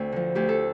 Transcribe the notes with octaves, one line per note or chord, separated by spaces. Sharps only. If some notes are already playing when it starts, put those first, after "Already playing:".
Already playing: D2 C4 D5
D3 F3
D2 G4
A4